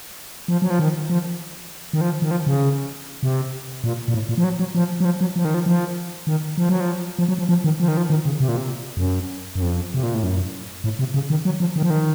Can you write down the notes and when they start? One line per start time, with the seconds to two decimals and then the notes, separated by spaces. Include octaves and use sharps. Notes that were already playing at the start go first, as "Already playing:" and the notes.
0.48 F3
0.62 F#3
0.70 F3
0.79 D#3
1.10 F3
1.93 D#3
2.01 F3
2.22 D#3
2.31 F3
2.47 C#3
3.23 C3
3.84 A#2
4.08 A#2
4.14 A2
4.29 A#2
4.38 F3
4.44 F#3
4.59 F#3
4.75 F3
5.00 F#3
5.05 F3
5.21 F#3
5.36 F3
5.45 D#3
5.54 F3
5.66 F3
6.27 D#3
6.58 F3
6.69 F#3
6.80 F3
7.19 F3
7.28 F#3
7.39 F3
7.49 F3
7.64 D#3
7.80 F3
7.88 D#3
7.97 F3
8.10 D#3
8.25 C#3
8.40 C3
8.49 A#2
8.57 C3
8.97 F2
9.01 F#2
9.55 F#2
9.62 F2
9.94 C3
10.03 A#2
10.14 A2
10.23 F#2
10.84 A2
10.99 C3
11.14 C#3
11.30 D#3
11.45 F#3
11.60 F3
11.76 D#3
11.83 F3
11.90 D#3